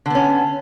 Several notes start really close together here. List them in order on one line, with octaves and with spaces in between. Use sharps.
D3 B3 C#4